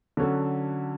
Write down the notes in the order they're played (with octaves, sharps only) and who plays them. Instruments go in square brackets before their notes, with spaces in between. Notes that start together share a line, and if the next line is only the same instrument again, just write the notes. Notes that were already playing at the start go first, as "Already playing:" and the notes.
[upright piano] D3 F#3 C#4 F#4 A4